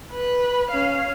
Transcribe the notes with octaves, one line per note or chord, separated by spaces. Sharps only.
B4
C#4 F5